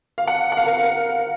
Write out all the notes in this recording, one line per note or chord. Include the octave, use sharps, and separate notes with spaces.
F5
F#5
F#5
F5
A#4